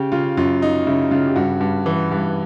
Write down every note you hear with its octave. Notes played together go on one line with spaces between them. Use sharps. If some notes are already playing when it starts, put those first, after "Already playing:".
Already playing: C#3 G4
C#3 F4
F#2 F4
F#3 D#4
C#3 E4
C#3 F4
G4
G2 F#4
G2
E3
G2